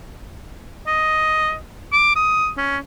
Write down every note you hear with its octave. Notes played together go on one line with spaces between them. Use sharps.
D#5
D6
D#6
C#4